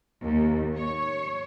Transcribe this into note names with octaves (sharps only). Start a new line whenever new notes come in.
D#2
C#5